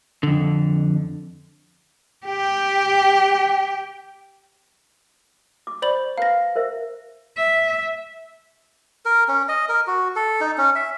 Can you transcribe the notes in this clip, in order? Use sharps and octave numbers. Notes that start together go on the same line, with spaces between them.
F2 D3
G4 G5
D6
C5 D5 B5 C#6 F#7
B4 F5 A#5 A#6
A#4 C5 E5
E5
A#4
C#4
D#5
A#4
F#4
A4
D#4
C#4
E5